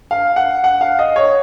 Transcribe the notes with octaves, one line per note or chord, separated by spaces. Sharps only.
F5
F#5
F#5
F5
D#5
C#5